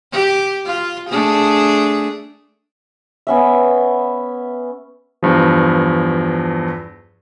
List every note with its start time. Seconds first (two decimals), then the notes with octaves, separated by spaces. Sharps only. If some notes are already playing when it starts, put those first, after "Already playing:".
0.13 G4
0.66 F4
1.09 A3 D4 G#4
3.27 B3 C#4 E5
5.23 E2 G2 F3